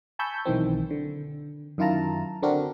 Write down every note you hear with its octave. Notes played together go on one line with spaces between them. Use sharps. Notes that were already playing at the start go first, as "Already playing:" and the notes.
G#5 A5 B5 C#6 E6 G6
B1 D#3 E3 C4
D3
F#2 D#3 E4 F4 A5 A#5
D3 C4 D4 F#4 A#4